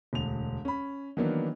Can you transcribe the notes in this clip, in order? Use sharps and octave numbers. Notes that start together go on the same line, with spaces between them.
E1 D2 F7
C#4 B5
D#3 E3 F#3 A#3 B3 D4